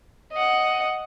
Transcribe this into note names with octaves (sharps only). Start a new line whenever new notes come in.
D#5 F#5